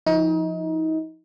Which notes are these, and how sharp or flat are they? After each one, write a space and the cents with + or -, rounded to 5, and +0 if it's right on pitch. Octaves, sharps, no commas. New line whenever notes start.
F3 +0 D#4 +30